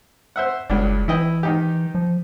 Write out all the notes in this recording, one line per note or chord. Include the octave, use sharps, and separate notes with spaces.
C5 E5 F#5
F#1 C#2 G2 D4
E3 E4 D#5 G5
D#3 D#4 G4
F3